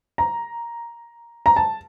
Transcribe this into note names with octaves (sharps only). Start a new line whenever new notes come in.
A#5
A#5
A5